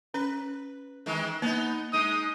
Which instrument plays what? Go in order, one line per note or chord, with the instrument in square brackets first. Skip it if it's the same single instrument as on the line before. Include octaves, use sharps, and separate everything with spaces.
[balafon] C#4 [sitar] B4
[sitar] D#3 E3 G#3
[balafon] A#3 [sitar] B3 D#4
[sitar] G#3 D#4 [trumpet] D#6